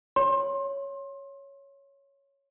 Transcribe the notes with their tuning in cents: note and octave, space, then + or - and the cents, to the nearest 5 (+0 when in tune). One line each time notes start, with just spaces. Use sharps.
C#5 +0 C6 +30